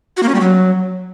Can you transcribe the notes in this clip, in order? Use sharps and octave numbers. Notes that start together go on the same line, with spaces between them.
F#4
A#3
C#4
G3
F#3